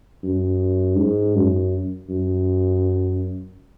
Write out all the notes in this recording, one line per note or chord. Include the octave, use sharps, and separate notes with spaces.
F#2
G#2
F#2
F#2